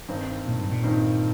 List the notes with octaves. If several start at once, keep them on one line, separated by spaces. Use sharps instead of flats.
G2 D#3 C4 D#4
A#2
G2
A#2
G2 D#3 C4 D#4